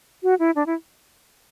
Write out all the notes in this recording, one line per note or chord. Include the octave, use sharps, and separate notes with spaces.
F#4
E4
D4
E4